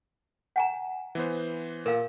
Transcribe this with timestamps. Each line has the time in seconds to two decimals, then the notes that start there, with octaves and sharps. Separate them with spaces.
0.56 F#5 G#5 A#5
1.15 E3 B3 C5
1.86 A#2 A#4 F5